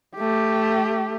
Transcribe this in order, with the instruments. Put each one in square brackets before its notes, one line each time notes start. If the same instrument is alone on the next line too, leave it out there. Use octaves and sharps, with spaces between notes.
[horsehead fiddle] A3 G4